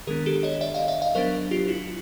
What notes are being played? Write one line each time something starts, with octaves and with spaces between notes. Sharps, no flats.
D#3 G#3 B3 D4 G#4 A#4
G4 A4
C#5 D#5
D5 E5
D#5 F5
D5 E5
D#5 F5
F#3 B3 D4 A#4 C5
F4 G4
E4 F#4